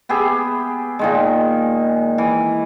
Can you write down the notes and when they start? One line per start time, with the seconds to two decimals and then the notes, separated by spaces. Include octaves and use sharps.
0.09 B3 G4 G#4 E5
0.99 A#2 D#3 G#3
2.18 E3